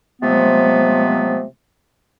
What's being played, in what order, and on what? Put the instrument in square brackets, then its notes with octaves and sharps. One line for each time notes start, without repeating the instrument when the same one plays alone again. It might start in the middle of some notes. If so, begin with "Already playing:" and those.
[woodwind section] C3 F3 F#3 G#3 A3 B3